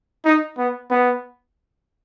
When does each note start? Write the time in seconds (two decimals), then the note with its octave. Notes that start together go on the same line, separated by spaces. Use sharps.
0.25 D#4
0.58 B3
0.90 B3